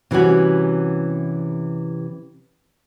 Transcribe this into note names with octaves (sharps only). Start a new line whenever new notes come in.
C3 E3 G3 C#4 F#4